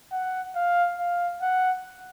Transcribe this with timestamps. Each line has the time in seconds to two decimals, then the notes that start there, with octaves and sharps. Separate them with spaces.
0.12 F#5
0.55 F5
0.98 F5
1.42 F#5